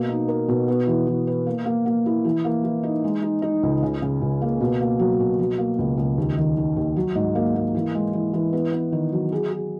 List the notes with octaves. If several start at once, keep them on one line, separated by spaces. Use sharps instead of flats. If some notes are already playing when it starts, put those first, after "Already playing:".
Already playing: B2 A#3
D#4
A#4
B2
B3
E3
E3
B4
A#3
A#3
A#3
E4
E3
A#3
E3
D#4
G#3
D#4
D#4
C#2
C#3
C#3
C#2
A#3
B2
A#3
F#3
B2
F#3
A#3
C#2
C#2
D#2
D#3
D#3
D#2
F#3
G#2
A#3
A#3
E3
G#3
E3
E3
B3
B3
D#3
F#3
G#4
G#4